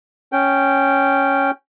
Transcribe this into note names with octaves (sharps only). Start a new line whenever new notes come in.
C#4 G5